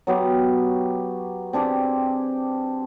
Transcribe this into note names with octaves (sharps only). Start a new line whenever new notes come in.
F#3 B3 G4
C4 D4 G4 G#4